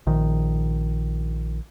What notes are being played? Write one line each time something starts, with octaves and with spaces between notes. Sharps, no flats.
A#1 D#3